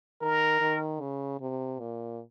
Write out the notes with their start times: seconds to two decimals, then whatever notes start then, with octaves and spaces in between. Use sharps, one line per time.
0.21 D#3 A#4
0.61 D#3
1.01 C#3
1.40 C3
1.80 A#2